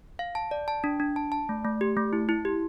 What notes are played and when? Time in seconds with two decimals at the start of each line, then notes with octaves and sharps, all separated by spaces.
0.19 F5
0.35 A5
0.51 D5
0.68 A5
0.84 D4
1.00 D4
1.16 A5
1.32 A5
1.49 A3
1.65 A3
1.81 G4
1.97 A3
2.13 E4
2.29 E4
2.45 G4